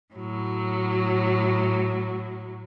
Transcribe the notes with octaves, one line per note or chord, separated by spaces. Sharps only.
A2 F#3